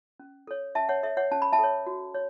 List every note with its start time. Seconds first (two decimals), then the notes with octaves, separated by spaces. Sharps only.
0.20 C#4
0.47 A4 C#5
0.75 C#4 E5 A5
0.89 C#5 F#5
1.03 A4 C#5 E5
1.17 C#5 F#5
1.31 C#4 A5
1.42 B5
1.52 E5 A5
1.59 A4 C#5
1.87 F#4
2.15 C#5